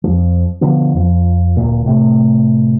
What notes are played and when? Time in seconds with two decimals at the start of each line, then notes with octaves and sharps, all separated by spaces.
0.04 F2 F3
0.61 B2 D3 F3 B3
0.94 F2 F3
1.57 D1 A#2
1.86 A2 C3 A3